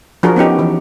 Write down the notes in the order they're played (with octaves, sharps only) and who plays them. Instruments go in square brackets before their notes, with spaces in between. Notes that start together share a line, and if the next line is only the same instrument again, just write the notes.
[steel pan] F3 D4 F#4 G#4 A#4
B3 C#4 D#4 G4
E3